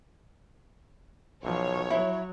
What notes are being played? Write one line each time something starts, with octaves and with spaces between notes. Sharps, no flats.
B1 F3 C#5
F#3 E4